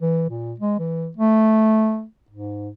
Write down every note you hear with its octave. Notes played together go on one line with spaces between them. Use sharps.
E3
A#2
G#3
E3
A3
G#2